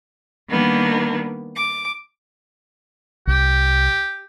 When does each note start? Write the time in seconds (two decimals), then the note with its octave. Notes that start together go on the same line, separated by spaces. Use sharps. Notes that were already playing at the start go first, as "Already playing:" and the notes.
0.49 D#3 G3 A#3 B3 D4
1.56 D6
3.27 C2 G4